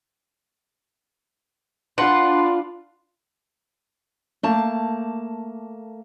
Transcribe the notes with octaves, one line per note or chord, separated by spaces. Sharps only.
D4 F4 B4 F#5 C6
A3 A#3 A5